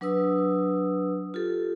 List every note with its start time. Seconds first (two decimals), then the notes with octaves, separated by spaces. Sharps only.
0.01 F#3 D4 B4 D#6 E6
1.34 F4 G4 A4